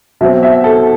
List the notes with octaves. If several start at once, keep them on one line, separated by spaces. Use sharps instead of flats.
B2 F#3 C4 E5
E5
A4